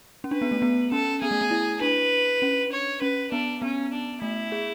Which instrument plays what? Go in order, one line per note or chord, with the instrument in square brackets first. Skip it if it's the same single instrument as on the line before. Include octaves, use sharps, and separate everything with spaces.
[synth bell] C#4
[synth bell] D4 [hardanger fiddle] B4
[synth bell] B3
A3
B3
[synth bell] C#4 [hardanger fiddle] A4
[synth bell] B3 [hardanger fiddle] G#4
[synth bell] A3
B3
E4
[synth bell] D4 [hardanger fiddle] B4
[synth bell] C#4
[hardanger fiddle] C#5
[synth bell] C#4 [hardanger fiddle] B4
[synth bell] B3 [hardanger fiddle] D4
[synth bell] B3 [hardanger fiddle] C#4
[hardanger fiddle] D4
[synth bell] A3 [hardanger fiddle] E4
[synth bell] G#4